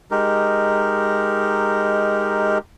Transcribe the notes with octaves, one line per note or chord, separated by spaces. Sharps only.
G#3 D#4 G4 A#4